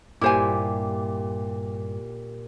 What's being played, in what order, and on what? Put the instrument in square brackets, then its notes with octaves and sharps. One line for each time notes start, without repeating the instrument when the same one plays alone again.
[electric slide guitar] G2 [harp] A#2 G4 [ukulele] E4 C5 G#5 [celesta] D6